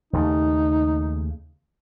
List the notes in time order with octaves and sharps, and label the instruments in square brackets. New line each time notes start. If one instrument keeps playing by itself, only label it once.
[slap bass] D#2 C#3 A3 [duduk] D#4